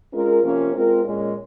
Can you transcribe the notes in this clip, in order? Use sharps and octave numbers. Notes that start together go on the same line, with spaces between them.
G#3 C#4 F4 A#4
C3 F3 A#3 C#4
G#3 C4 F4 A#4
A#2 G#3 C#4